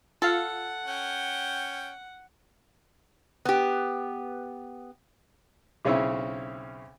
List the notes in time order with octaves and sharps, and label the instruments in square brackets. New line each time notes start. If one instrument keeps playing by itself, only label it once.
[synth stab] F4 F5 [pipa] A4 [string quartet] F#5
[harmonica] C#4 G5
[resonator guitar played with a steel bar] B3 G4
[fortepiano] B1 C#3 C4 C#4 E4 E5